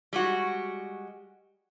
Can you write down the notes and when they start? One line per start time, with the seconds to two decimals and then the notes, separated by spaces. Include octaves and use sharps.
0.13 G3 G#3 F#4